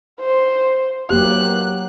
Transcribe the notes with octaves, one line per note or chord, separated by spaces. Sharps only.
C5
F#3 A#3 G4 F#6